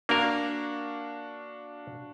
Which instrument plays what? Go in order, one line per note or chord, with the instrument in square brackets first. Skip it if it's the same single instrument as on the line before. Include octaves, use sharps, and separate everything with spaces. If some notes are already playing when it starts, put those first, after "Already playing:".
[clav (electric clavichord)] A#3 A#4 [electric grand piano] D4 F#4 F5